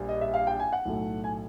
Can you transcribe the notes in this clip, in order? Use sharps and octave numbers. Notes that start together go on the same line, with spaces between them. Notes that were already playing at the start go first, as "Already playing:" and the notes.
Already playing: A#1 A#2 G3
D#5
E5
F5
G5
G#5
F#5
B1 A2 F#3 A3
G#5